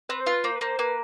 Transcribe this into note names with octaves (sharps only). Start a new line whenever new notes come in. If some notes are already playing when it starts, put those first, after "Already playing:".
C4 B4
C5
F4 B4
A#3 C5
B4
A#3 C5
A#3 B4